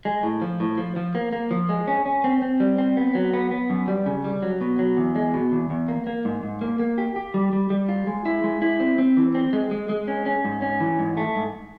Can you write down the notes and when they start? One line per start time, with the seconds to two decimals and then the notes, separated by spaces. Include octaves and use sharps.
0.05 G#3
0.23 A2
0.42 F3
0.60 A2
0.77 F3
0.96 F3
1.15 A#3
1.33 A#3
1.51 F3
1.69 G#3
1.88 C#4
2.06 C#4
2.24 C4
2.42 C4
2.60 G3
2.78 C4
2.97 B3
3.15 F#3
3.34 B3
3.51 B3
3.70 F#2
3.88 G3
4.06 C#3
4.24 G3
4.42 F#3
4.61 B2
4.79 F#3
4.97 E2
5.16 G#3
5.34 B2
5.52 E2
5.70 E2
5.88 A#3
6.07 A#3
6.25 G#2
6.43 G#2
6.61 A#3
6.80 A#3
6.98 G4
7.16 G4
7.34 G3
7.53 G3
7.70 G3
7.89 F4
8.07 G#3
8.25 E4
8.44 G#3
8.62 E4
8.80 C4
8.98 C4
9.17 E3
9.35 C4
9.53 G#3
9.71 G#3
9.89 G#3
10.08 C#4
10.26 C#4
10.45 G#2
10.62 C#4
10.80 E3
10.99 G#2
11.17 A3
11.35 G#2